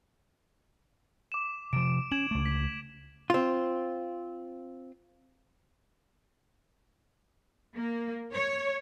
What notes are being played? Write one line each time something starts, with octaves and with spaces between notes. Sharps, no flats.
D6 E7
C3 F3 D7
C#4 G#6 E7 F#7
C#2 A3
B6
C4 F4
A#3
C#5